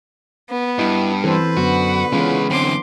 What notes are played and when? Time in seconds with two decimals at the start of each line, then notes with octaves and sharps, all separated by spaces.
0.50 B3
0.79 G2 E4 D#5
1.24 E3 C4 A4 B4 C5
1.57 F#2 D3 B3 F#4
2.12 C#3 E3 G#3 B3 C#4 F4
2.50 F#2 D3 C4 C6 D6